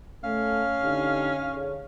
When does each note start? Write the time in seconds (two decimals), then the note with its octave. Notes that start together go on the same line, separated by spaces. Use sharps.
0.24 A3 C#4 F5
0.82 D3 D#4 G4
1.51 D3 G#4 C#5